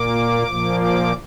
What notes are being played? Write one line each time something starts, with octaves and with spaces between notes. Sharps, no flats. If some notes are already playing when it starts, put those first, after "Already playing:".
Already playing: A#2 A#3 D6
A#2 F3 A#3
D6